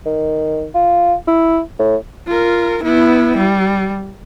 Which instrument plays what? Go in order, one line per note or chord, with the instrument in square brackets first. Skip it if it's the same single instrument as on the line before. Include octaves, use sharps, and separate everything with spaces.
[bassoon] D#3
F4
E4
A2
[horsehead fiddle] F4 A#4
B3 E4
G3